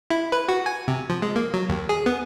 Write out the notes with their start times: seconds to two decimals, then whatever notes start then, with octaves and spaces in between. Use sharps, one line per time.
0.10 E4
0.32 B4
0.49 F#4
0.66 G#5
0.88 C3
1.10 F3
1.22 G#3
1.36 A#3
1.54 F#3
1.69 D#2
1.89 G#4
2.06 B3